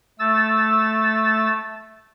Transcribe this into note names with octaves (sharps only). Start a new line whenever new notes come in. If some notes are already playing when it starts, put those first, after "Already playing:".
A3 E6 A6